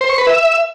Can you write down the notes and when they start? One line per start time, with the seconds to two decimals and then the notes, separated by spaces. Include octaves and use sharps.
0.01 C5
0.10 C#6
0.18 B4
0.27 E5